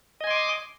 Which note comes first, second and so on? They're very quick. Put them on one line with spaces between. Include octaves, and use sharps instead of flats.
D#5 G#5 C6 D6